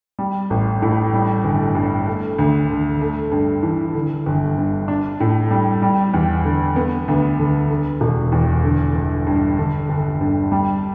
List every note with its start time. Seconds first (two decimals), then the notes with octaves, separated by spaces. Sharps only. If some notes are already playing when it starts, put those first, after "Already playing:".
0.19 G3
0.50 A1
0.82 A2
1.14 G3
1.44 G1
1.75 G2
2.07 A3
2.39 D2
2.70 D3
3.01 A3
3.32 G2
3.63 E3
3.95 D3
4.26 G1
4.58 G2
4.88 D4
5.20 A2
5.51 G3
5.82 G3
6.14 E2
6.45 D3
6.76 B3
7.08 D2
7.39 D3
7.70 D3
8.01 E1
8.32 E2
8.64 D3
8.96 G1
9.27 G2
9.59 D3
9.89 G1
10.21 G2
10.52 G3